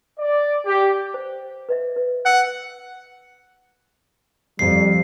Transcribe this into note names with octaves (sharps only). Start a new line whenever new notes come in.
D5
G4
C5
B4 D#5 E5
B4
E5 F#5 E6
F2 G3 C7